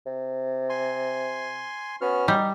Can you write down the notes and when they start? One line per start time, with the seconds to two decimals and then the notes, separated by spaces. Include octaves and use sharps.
0.06 C3
0.69 G#5 C6
2.01 B3 C#4 F#4 F6
2.28 G3 D#4